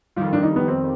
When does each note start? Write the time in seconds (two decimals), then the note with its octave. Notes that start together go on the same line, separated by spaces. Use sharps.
0.16 F2 D#3 G3 F4
0.33 D4
0.43 D#4
0.56 B3
0.68 C4